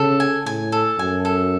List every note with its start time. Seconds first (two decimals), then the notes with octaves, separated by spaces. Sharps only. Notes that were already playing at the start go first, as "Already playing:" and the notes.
Already playing: C#3 A4
0.20 G#5
0.46 A2 G#5
0.72 A4
0.99 F#2 G#5
1.25 A4